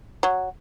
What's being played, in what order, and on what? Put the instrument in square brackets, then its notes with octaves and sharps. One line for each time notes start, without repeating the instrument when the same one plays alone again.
[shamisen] F#3